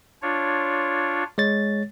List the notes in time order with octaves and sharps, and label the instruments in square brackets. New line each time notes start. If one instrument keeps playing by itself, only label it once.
[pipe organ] D4 F4 C#5
[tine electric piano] G#3 C#5 A6